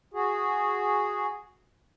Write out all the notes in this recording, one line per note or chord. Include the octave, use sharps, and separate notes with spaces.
F#4 G#4